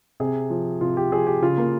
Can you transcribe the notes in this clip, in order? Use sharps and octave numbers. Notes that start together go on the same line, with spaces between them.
C3 G#4
F3
C3 F4
G4
F3 G#4
G4
C#3 F4
A#3